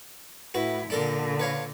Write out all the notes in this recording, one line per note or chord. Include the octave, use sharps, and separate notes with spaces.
A2 E4 F#4 B4
A#2 D3 D4 A4 A#4
B4 C#5 F5